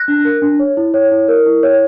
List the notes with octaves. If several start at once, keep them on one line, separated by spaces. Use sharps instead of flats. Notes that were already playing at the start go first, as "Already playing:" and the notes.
Already playing: F#6 A#6
D4
A#4
D4
C#5
E4
C#5
E4
A#4
E4
C#5